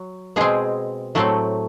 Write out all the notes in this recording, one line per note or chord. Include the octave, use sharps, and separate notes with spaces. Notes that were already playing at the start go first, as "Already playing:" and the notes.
Already playing: F#3
B2 G#3 C4 G#4
A2 F#3 A3 C4